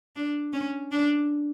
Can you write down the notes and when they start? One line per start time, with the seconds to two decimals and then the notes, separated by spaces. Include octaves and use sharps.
0.16 D4
0.53 C#4
0.92 D4